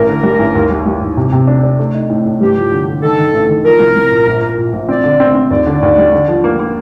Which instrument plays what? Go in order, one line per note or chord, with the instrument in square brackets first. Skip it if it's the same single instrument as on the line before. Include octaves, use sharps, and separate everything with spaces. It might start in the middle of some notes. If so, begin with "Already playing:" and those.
Already playing: [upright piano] A1 [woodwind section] A#4
[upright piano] D3
G3
A1
D#2
G3
G3
D#2
C3
C3
D4
D4
A3
D#4
A2
A2
[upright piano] G2 [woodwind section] G4
[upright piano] F3
D3
D3
[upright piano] D#3 [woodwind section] A4
[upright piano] D#3
A1
D#3
[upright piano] F3 [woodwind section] A#4
[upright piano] C2
C2
A#2
A#1
A#2
A#2
A#1
[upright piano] C4 [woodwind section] D5
[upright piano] D3
C4
C4
[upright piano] D#2 [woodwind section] D5
[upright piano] D3
D#2
G3
D3
F3
A#3
A#3